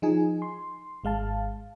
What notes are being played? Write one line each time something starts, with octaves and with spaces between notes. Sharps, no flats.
F3 D#4 G#4 G#5
C6
G#1 G#3 F5 A5